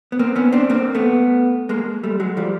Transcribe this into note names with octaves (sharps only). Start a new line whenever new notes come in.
B3
A#3 C4
B3 C#4
C4 D4
A#3 C4
A3 B3
G#3 A#3
G3 A3
F#3 G#3
F3 G3